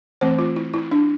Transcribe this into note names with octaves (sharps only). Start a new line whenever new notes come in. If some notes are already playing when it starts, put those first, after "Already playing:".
E3 A3 C4 C5
F4
E4
E4
D4